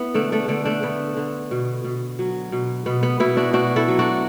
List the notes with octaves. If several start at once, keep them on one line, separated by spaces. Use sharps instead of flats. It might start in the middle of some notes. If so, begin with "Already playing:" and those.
Already playing: B3 E4
D3 A3 D4
A3 D4
D3 A3 D4
A3 D4
D3 B3
D3
B2
B2
F#3
B2
B2 B3
B3
B2 B3 E4
D4 F#4
B2 D4 F#4
E4 A4
F#3
D4 F#4